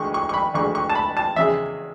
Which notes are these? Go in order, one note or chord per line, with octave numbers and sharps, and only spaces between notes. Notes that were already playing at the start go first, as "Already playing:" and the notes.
Already playing: D2 D3 G#3 C#6
C#6
C#6
B5
D2 D3 G#3 C#6
C#6
A5
B5
A5
E2 C#3 G#3 E5